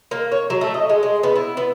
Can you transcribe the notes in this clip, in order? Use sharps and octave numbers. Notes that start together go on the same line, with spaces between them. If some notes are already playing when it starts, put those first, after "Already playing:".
A#3
C#5
F#3
A3
D#5
G#3
G#3
B3
E4
B3